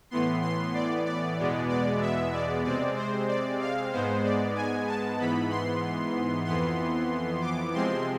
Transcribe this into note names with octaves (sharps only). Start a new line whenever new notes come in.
A2 E3 B3 C6
C6
D5
D5
E2 B2 G#3 B3
D5
E5
D5
C3 G#3 C4 D5
C5
D5
F5
G#2 G#3 B3 C5
D5
G#5
A5
G#2 E3 B3 B5
C6
F2 E3 B3 C6
D6
C3 F3 G#3 C4 C6